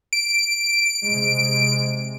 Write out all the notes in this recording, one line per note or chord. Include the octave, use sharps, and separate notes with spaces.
D7
C3 G#3